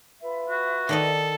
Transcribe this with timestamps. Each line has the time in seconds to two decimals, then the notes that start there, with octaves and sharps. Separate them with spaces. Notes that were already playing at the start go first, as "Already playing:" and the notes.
0.20 F4 B4 E5
0.49 F#4
0.89 D#3 A4 D5 D#5